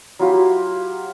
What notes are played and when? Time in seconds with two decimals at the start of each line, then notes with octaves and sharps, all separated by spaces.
0.19 F#3 E4 F4 G4